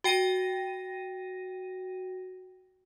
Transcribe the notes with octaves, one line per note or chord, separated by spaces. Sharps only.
F#4 G5 A#6 D#7